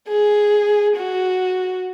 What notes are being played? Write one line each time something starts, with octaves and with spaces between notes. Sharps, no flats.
G#4
F#4